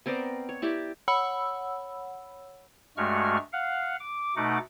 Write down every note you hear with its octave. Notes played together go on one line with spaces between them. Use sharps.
B3 C4 A#4 D5
C#5
E4 G4 D5
C#5 F#5 B5 E6
G2 G#3 A3 F#4 C#6 F6
F5 F#5
D6
B2 A3 D#4 F#5 D6